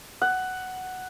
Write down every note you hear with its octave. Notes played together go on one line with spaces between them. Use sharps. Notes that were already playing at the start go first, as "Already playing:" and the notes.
F#5